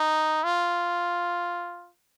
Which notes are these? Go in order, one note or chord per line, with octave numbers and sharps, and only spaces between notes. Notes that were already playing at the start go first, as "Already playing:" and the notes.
Already playing: D#4
F4